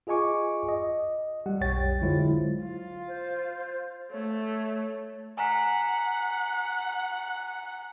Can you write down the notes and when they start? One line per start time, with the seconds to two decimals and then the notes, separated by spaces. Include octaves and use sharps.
0.07 F4 G#4 D#5 G#5 C#6 D6
0.69 D#5
1.46 G3 G4 F#5
1.61 B1 F2 C#5 G5 A6
2.01 D3 F#3 G#3 E4 F4 C5
2.64 F4
3.08 C5
4.11 A3 C#5
5.37 F#5 G#5 A#5 B6